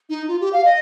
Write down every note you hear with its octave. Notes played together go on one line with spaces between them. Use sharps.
D#4
F4
G4
F5
D#5